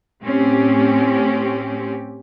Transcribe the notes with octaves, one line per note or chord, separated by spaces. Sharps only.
A2 C4 C#4 G4